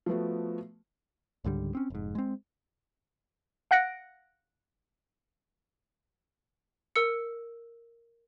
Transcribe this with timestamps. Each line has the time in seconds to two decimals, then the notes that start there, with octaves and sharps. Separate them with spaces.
0.06 F3 A3 B3 F#4
1.44 C#2 G#2 D3 G3
1.75 C4 C#4
1.90 F1 G#2
2.15 G#3 C4
3.71 F5 F#5 F#6 A#6 C#7 D7
6.96 A#4 E6 C#7